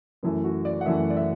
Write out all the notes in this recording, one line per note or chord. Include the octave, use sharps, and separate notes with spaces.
F#2 E3 A3
F#4
D5
F#5
F#2 E3 A3 E5
D5
E5